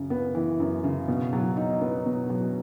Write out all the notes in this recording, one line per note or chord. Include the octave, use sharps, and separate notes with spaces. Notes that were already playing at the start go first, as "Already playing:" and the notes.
Already playing: F#2 C#3
B3
E3
F#2
C#3
B2
F#3
D#4
B3
B2
F#3